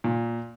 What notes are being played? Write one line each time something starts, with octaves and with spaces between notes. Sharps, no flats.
A#2